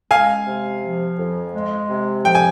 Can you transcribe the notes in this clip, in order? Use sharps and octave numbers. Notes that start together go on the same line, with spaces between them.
G#3 F5 G#5
C3
F3
F2
G#3
C3
F3 G5
G#5